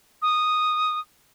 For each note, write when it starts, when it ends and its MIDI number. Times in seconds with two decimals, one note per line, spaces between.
0.22 0.99 87